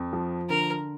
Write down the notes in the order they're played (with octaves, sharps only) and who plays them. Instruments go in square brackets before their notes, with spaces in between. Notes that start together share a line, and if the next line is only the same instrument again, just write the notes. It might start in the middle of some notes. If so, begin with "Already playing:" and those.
Already playing: [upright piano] F2
F3
[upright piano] D3 [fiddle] A#4